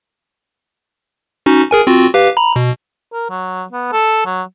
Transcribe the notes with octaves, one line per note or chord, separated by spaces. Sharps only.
C#4 D#4 F#4
G#4 A#4 G#5
C4 F4 F#4
G4 B4 F5
A#5 B5
B2
A#4
F#3
B3
A4
F#3